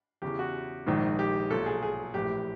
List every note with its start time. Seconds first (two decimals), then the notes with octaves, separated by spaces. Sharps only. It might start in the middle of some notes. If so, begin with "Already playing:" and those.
0.22 E2 C#3 E3 G4
0.39 F#4
0.87 A#1 G#2 D#3
1.19 G4
1.50 B1 A#2 A4
1.66 G#4
1.83 G#4
2.14 A#1 A2 E3 G4